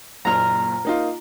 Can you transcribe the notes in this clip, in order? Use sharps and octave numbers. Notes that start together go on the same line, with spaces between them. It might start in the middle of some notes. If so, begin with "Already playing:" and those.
F#1 A#2 A#5 F6
A#3 D#4 F4